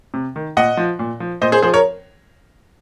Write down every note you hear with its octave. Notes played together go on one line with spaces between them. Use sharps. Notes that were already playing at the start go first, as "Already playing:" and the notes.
C3
D#3
A#2 D#5 F#5
F3
A#2
F3
A#2 C5 D#5
G#4 C5
F3 G#4 C5
A#4 C#5